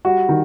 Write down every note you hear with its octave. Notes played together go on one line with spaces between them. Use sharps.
G3 F#4
D#3